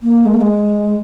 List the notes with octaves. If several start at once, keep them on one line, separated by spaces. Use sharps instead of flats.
A#3
G#3
A#3
G#3